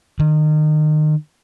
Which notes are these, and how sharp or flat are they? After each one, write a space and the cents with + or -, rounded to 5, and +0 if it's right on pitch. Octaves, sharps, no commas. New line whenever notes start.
D#3 -30